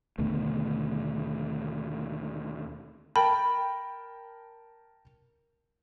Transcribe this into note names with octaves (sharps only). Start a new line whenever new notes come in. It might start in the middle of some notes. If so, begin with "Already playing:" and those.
D#2 B2 D3 A3
A#4 G5 A5 B5